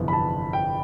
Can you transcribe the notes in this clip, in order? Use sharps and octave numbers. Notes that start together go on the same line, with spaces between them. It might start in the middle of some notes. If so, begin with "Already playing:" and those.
Already playing: G1 F2 C3 E3 B3
B5
A5
G5